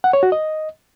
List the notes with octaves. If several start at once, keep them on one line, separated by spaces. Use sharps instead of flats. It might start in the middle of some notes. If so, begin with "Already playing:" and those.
F#5
C#5
F#4
D#5